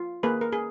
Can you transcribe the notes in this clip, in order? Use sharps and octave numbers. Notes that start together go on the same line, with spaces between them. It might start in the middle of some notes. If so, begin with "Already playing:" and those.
Already playing: F4
A#3 G#4 B4
A#4
G#4